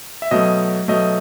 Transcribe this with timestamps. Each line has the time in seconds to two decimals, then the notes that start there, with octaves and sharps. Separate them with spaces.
0.22 E5
0.31 B2 F#3 A3 D#5
0.88 B2 F#3 A3 D#5